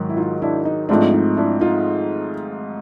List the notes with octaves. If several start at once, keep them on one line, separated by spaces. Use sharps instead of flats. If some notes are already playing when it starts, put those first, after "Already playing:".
Already playing: G#2 D#3 F#3
E4
D#4 F4
D4 E4
D#4
G#2 F3 A3 C4 D4
D#4
D4 E4
D#4 F4